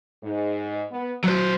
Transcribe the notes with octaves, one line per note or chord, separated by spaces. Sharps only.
G#2
B3
F#3 F#4 C5